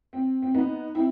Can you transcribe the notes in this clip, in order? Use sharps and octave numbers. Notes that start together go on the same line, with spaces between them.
C4
C4
B3 D#4
C4 E4